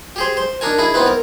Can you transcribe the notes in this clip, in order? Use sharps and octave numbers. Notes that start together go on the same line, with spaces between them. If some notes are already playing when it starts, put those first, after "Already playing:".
G4 G#4 C5
C5
D4 D#4 A#4 G#5
D#4 E4 G#4
B3 C4 D#4 E4 B4
A#4